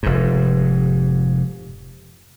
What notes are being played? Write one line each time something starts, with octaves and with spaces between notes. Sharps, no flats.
F1 G#2